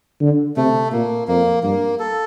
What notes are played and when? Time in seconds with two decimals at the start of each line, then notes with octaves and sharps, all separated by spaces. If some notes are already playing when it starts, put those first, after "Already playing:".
0.20 D3
0.56 C3 A3
0.92 A#2 A#3
1.28 F2 A#3
1.63 G2 A#3
1.99 A4